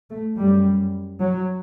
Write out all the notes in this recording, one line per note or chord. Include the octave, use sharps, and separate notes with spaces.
A3
F#2 G3
F#3